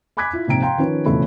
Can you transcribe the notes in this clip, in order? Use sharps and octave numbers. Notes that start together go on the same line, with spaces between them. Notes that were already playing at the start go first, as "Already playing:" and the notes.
G#5 B5 D6 F#6 G#6 B6
E4 F4
A#1 G#2 C3 G5 A#5 D7
F5 G5 A#5 C6
D#3 F3 C#4 B4
E1 F2 C#3 A3 E4 B5